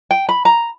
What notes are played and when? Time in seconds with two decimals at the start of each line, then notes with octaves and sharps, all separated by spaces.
0.11 G5
0.29 B5
0.45 A#5